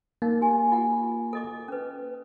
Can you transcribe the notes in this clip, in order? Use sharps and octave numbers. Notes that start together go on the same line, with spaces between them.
A#3 D#4
G4 G#5
F4 F#5
A4 D#5 D6
C#4 B4